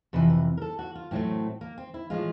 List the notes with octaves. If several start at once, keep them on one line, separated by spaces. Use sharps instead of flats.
F2 C3 E3 B4
B4
A#4
A4
F#4
F4
A2 F#3 A3 C4
A#3
C4
E4
A2 F3 G#3 F4